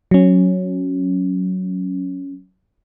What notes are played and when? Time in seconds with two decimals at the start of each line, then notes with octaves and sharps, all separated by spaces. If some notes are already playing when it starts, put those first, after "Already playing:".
0.11 F#3 C#4